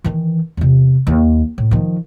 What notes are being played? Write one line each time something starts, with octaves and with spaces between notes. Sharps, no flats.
D#3 E3
E2 C3
D#2
A2
D#3 F3